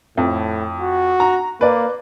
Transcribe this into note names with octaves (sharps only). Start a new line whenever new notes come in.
F2 A2
F#4
A#5
A#3 B4 D5